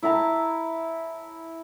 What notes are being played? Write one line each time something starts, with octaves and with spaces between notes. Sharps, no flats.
E4 E5 A5 A#5